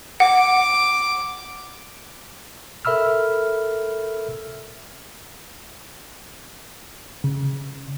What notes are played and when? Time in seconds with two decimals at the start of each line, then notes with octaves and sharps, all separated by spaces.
0.20 F#5 D6
2.85 A4 A#4 E5 B5 E6 F6
7.24 C#3